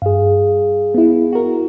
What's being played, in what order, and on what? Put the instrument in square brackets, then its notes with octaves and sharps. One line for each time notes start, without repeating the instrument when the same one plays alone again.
[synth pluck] G2 [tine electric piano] G#4 F5
[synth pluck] B3 E4
F#4 A#4